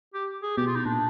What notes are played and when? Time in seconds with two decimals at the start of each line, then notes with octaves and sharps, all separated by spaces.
0.14 G4
0.42 G#4
0.57 B2 G4
0.67 F4
0.76 D#4
0.85 A#2 D4